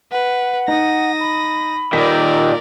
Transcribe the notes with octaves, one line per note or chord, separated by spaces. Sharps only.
B4 F#5
D#4 D#6 A#6
B5
A#2 D#3 A#4 D5 B6